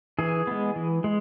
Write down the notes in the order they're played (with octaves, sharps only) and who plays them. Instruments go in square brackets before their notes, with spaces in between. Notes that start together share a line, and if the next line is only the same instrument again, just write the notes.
[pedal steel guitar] E3 G#4
G#3 B3
E3
G#3